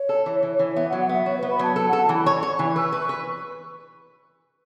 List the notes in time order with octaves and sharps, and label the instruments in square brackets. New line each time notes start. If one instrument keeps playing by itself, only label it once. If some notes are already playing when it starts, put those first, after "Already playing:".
Already playing: [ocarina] C#5
[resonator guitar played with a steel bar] A4
E3
E3
E3
[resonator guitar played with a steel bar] B3 [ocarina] E5
[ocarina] F#5
[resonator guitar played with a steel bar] F#3
[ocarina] F#5
[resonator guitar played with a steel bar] B3 [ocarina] E5
[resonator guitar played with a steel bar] F#4 [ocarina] C#5
[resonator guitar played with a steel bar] B3 [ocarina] B4
[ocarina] B5
[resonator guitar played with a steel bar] F#3 [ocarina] A5
[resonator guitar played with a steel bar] A4 [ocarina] A5
[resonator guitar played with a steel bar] A4 [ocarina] F#5
[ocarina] A5
[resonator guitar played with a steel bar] E3 [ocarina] B5
[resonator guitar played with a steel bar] C#5 [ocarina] C#6
[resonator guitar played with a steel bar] C#5
E3
[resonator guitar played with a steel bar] B4 [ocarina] E6
[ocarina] C#6
[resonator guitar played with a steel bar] B4
[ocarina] C#6
[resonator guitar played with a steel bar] B4